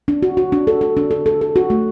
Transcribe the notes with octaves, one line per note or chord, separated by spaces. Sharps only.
D4
F#4
F#4
D4
A4
A4
D4
A4
A4
A4
F#4
A3